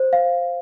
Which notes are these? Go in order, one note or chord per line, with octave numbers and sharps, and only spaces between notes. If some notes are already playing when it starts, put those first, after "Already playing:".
Already playing: C5
F5